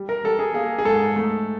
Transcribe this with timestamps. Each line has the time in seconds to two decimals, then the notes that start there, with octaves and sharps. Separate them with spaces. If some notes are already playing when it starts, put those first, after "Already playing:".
Already playing: G3
0.09 A#4
0.24 G3 A4
0.39 G#4
0.54 A#3 G#4
0.78 G#4
0.85 G#2 A4
1.16 A3